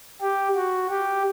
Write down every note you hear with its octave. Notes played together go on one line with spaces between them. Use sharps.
G4
F#4
G4